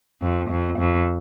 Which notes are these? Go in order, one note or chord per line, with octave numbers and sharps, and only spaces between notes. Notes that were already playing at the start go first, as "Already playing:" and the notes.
F2
F2
F2